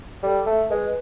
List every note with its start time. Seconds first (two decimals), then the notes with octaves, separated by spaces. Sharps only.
0.23 G3 A4
0.46 A3
0.70 G#3 B4